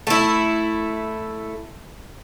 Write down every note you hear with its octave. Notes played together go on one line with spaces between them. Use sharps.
A3 E4